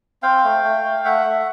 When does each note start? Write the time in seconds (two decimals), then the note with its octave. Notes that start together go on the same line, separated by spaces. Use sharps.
0.22 C4 F5 G5
0.44 A3
0.64 A3
0.85 A3
1.05 A3 E5 F#5
1.25 A3